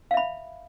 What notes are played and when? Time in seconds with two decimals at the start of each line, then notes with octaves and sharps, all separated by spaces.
0.11 F5
0.14 E5
0.17 B5